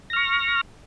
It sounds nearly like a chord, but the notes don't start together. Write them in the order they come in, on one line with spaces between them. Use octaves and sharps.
A#6 F6 C#6